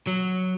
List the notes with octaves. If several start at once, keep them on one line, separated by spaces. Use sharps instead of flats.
F#3